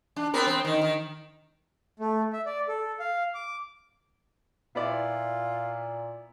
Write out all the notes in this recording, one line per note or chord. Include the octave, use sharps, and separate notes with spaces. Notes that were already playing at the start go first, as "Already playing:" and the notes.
D4
B3 C4 A#4
C4
D#3
D#3
A3
E5
D5
A4
F5
D6
A#2 B3 E4 F4 D5